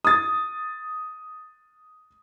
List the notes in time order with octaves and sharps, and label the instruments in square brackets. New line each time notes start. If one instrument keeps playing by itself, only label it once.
[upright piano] D#6 A6